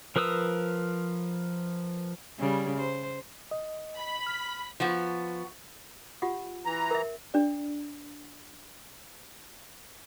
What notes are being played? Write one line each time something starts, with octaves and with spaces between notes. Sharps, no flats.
F3 A#4 B4 D#6 E6
C#3 G3
C5
D#5
B5
F6
F3 B3 F#4
F4 G4 F#5
E3 A#5
A#4 E5
D4 D5